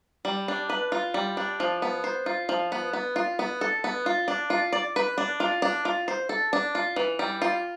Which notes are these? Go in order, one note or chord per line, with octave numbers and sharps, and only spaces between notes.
G3
D4
B4
F4
G3
D4
F3
B3
C5
F4
F3
B3
B3
F4
B3
A4
B3
F4
D4
F4
D5
B4
D4
F4
D4
F4
C5
A4
D4
F4
E3
G3
F4